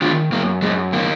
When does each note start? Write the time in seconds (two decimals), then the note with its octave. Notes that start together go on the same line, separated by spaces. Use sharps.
0.02 D#3 D4 F4
0.32 F#2 A#3
0.62 F#2 G#3
0.93 D#3 A#3